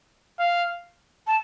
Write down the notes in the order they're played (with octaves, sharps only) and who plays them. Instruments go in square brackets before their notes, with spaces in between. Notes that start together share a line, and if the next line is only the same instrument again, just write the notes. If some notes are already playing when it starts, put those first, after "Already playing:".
[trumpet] F5
[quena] A5